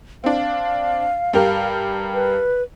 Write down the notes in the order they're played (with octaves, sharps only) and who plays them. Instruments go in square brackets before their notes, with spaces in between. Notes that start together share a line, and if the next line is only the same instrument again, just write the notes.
[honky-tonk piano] C4 D4 [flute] F5
[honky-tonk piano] G2 G4 A#4
[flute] B4